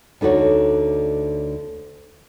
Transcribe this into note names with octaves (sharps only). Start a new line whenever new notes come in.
D2 D3 D#4 F#4 C#5